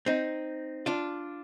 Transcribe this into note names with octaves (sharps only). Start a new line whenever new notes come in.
C4 D#4
D4 F4